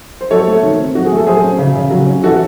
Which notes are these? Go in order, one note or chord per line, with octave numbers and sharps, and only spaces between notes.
C5
F#3 A4 C#5
A3
D#3
C4
F#3 F#4
G#4
A3 A4
F#3 G#4 C5
C#4
C#3
C#3
F#3
C#4
E3 F#4 A4